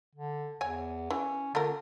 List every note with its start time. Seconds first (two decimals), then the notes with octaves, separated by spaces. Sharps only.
0.15 D3
0.61 E2 C#5 G#5
1.10 E3 C#4
1.55 D3 A3 F4 A#4